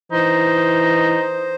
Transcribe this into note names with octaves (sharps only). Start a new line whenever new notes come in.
E3 D#4 C5